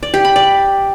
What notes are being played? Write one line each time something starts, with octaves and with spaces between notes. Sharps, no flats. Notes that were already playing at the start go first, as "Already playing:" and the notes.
D5
G4
B5
D5